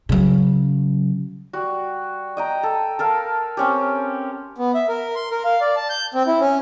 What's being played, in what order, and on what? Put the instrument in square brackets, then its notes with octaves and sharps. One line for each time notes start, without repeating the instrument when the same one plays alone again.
[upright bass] C#3 F#3
[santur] G3 F#4
D#5 G5 A#5
A4
A4 A#4 F5
C4 C#4 G4
[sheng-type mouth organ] B3
E5
A#4
C6
A#4
F5
D5
A5
G6
C4
E4
C#4